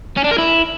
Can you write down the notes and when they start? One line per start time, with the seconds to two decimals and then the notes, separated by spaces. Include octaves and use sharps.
0.17 C#4
0.24 D4
0.31 A#4
0.38 E4